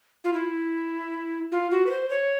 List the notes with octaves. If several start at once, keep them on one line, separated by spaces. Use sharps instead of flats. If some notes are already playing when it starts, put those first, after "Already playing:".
F4
E4
F4
F#4
B4
C5
C#5